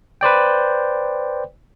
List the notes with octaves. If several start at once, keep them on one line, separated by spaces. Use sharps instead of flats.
B4 C5 D5 G5